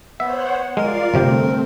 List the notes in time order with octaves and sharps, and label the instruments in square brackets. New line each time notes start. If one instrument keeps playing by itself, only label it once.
[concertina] B3 [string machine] C5 C#5 F#5 [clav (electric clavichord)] E5
[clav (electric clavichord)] G#3 [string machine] F4 D5 F5 [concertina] A#4
[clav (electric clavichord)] G1 C3 G4 [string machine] A3 C4